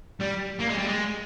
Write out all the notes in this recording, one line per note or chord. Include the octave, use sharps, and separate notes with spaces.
G3
A#3
G#3
G3
G#3